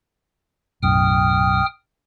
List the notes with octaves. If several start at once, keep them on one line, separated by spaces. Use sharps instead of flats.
B1 F#2 A2 G5 D#6 F6